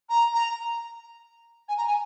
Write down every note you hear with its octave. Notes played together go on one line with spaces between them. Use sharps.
A#5
A#5
G#5
A#5
G#5